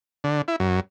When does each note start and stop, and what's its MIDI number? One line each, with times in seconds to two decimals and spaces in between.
0.24 0.42 50
0.48 0.56 64
0.60 0.80 42